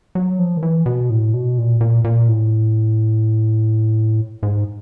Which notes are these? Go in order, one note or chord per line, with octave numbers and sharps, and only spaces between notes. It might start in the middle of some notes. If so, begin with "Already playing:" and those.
F#3
F3
D#3
E3
B2
A2
B2
A#2
A#2
A#2
A2
G#2